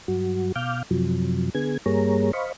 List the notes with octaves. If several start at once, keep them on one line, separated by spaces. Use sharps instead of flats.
G2 F#3 F#4
B2 F5 D6 F6 G6
F#2 C3 F3 F#3
D3 B3 G#4 G#6
G2 G3 A#3 G#4 C#5 A#5
C5 D#5 F5 B5 C#6